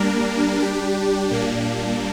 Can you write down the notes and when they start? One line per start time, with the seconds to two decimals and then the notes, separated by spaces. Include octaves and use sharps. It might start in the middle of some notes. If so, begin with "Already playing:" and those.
Already playing: G3 A#3 D4 A#4
0.59 G3 D4 G4
1.31 A#2 G3 A#3 D4